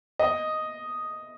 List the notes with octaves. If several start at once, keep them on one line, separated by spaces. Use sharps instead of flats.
D#5